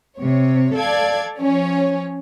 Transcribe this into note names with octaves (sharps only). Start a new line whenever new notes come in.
C3 C#5
A4 D5 F5 G#6
F3 C#4 C#5